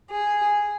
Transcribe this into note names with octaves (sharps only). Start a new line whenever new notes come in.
G#4